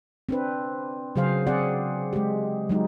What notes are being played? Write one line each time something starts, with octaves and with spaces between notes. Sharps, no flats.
C4 D4 B4
C#3 F#3 G#4 C5 F5
C4 G#4 D5 F#5
G#3 G4
F#3 G#3 D#4